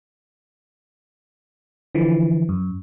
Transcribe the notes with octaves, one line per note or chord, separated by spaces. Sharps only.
D3 E3 F3
F#2